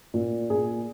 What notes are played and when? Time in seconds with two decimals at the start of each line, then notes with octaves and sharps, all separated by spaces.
0.14 A#2
0.50 A#2 G#4